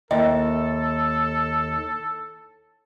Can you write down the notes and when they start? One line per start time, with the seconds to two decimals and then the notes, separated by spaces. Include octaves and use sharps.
0.11 D#2 A4 D#5 E5 G5